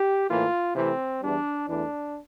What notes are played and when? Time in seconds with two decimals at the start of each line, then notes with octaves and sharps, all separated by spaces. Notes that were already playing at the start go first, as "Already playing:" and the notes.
Already playing: G4
0.29 A2 E3 A#3 F4
0.75 C3 E3 A3 C4
1.21 E2 E3 G3 D4
1.68 E2 E3 A3 D4